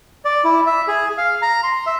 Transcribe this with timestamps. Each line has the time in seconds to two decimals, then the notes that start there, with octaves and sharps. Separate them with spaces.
0.25 D5
0.44 E4
0.67 E5
0.88 G#4
1.18 F5
1.42 A#5
1.63 C6
1.86 E5